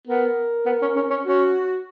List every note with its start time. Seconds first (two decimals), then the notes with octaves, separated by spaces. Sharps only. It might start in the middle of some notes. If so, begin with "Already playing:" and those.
0.07 B3 A#4
0.66 B3
0.82 C#4
0.96 C#4
1.10 C#4
1.25 C#4 F#4